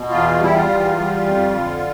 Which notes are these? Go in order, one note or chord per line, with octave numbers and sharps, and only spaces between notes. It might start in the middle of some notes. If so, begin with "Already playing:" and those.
Already playing: B2
E2 F4
G3 E4
F4
E2
G3
F2
D3